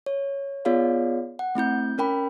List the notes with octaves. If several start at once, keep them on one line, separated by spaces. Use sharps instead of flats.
C#5
B3 F4 G#4 C#5 D5 F5
F#5
A3 C4 E4 G6
C#4 A#4 G5 B5